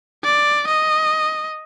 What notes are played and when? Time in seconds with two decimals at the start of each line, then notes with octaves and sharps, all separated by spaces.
0.24 D5
0.68 D#5